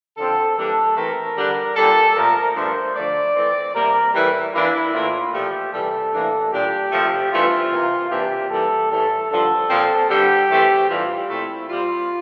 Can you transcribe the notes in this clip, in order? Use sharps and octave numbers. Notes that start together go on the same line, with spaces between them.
D3 F3 C4 A4
E3 G3 A#3 D4 A4
E3 A3 C4 A#4
D3 G3 D4
A#2 G3 D4 A4
A#2 F3 A3 A#4
G2 F3 A3 D4 C5
D3 F3 A3 D5
E3 A3 C4
C3 G3 A#3 A#4
A2 E3 G3
E3 A#3 D4 E4
A2 E3 A#3 D4 F4
A#2 F3 A3 G4
C3 E3 G3 A4
A2 E3 A#3 D4
A#2 G3 D4 G4
C3 F3 A3
G2 E3 A3 C4 F4
C3 E3 A#3
C3 E3 A#3 D4 G4
E3 G3 A#3 A4
A2 E3 G3 A4
G2 D3 F3 A4
A#2 F3 C4
G2 D3 G3 G4
E3 A3 C4
A2 E3 G3 D4 F4
A#2 A3 C4 E4
A#2 G3 C4 F4